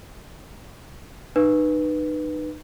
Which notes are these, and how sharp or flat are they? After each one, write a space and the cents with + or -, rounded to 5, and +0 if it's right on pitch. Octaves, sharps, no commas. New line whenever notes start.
D#4 -35 B4 -5